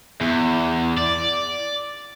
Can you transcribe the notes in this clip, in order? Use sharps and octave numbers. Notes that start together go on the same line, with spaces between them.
E2
D5